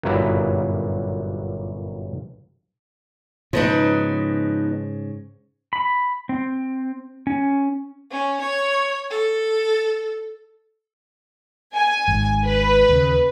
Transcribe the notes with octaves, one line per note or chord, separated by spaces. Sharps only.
G1 F#2 A#2 F#3 G3 E4
G#2 C#3 F3 B3 D#4
B5
C4
C#4
C#4
C#5
A4
G#5
G#1 G#2
B4
D#2 C#3